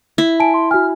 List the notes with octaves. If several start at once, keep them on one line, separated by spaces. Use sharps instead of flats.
E4
G#5 A5 D7
C6
F#4 G#5 F6